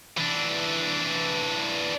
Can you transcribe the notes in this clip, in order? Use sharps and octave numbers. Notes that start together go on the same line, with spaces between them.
E3 D4